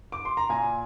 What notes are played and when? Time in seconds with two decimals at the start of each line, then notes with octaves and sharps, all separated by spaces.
0.12 D6
0.25 C6
0.37 A#5
0.49 A#2 G#5